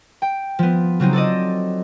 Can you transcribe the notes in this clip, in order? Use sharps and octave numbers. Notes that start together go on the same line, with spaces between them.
G5
F3 B3
C#3 F#3 C4 D#4
A4 C5 D5 D#5